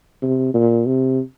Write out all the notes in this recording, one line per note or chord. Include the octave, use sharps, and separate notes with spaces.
C3
A#2
C3